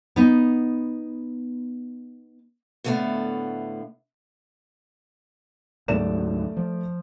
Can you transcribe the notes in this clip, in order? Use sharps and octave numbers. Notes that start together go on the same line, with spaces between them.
B3 D#4
A2 D3 A3 B3 F5
D2 G#2 F#3 A3 D5 E7
F3